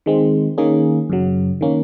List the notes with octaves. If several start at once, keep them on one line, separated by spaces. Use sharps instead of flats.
D#3 G#3 C4
D#3 A#3 C#4 G#4
F#2 C#3 F#3
D#3 A#3 C#4